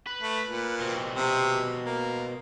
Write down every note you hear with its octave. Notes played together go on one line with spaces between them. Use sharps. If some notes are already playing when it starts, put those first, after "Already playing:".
B4
A3
A#2
B2 C4
C3
A#3